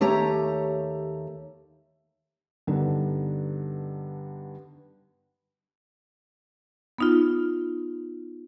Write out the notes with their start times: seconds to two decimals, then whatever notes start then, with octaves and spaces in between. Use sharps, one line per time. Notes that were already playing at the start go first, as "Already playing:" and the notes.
0.01 D#2 A3 G4 C#5 A#5
2.67 G2 D3 B3 D#4
6.98 B3 D#4 F4